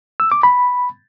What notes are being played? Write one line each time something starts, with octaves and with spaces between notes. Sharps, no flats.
E6
D6
B5